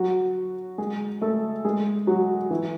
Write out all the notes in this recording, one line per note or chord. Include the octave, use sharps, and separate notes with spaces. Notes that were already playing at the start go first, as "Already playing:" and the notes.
Already playing: F#3 F#4
G#3 G#4
A3 A4
G#3 G#4
F#3 F#4
E3 E4